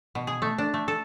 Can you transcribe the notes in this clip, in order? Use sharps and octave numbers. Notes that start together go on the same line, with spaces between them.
B2
G#4
A3
D4
A3
A4